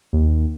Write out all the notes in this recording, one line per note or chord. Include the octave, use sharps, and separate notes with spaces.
D#2